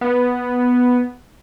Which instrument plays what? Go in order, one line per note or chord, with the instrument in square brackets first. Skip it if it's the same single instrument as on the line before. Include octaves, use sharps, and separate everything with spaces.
[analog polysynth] B3